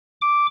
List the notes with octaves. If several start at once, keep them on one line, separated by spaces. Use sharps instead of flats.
D6